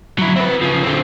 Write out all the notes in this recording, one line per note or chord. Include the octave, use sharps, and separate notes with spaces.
F#3 E4
C4 B4
C#3 F3
D3 C4